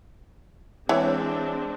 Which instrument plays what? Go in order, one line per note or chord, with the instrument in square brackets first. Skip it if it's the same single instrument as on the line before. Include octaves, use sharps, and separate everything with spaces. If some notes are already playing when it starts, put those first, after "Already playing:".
[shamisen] E3 [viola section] G#3 C4 D4 [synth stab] C#5